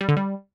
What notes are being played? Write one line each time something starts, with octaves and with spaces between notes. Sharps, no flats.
G3
D3
G3